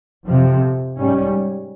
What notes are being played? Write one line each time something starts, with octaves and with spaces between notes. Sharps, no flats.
F2 C3 F3
G#2 G3 C#4